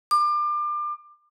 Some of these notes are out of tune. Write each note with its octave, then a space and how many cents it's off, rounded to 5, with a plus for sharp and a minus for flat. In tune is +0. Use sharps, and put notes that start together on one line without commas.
D6 +30